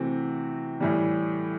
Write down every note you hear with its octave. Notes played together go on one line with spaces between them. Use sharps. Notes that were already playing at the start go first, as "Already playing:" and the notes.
Already playing: C3 E3 A3 C4 F#4
A2 E3 G3